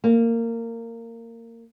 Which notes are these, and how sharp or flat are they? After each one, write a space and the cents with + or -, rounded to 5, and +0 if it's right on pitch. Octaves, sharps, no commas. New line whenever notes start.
A#3 -20